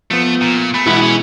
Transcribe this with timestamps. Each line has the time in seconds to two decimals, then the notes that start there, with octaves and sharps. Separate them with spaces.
0.11 F3 A3 B3
0.41 A#2
0.74 A3 B5
0.87 B2 E3 G#3 B3 E4 B5
1.02 C#4